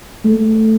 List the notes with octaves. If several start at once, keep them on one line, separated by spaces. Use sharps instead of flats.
A3